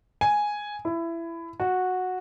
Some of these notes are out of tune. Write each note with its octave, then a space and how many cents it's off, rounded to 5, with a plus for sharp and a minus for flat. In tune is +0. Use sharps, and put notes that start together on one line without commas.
G#5 +0
E4 +20
F#4 -10